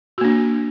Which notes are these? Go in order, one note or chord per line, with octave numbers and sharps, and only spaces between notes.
A#3 D4 F#4